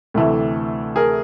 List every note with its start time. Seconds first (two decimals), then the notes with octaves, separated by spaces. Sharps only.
0.14 D2 C3 E3 A3
0.96 G#4 A#4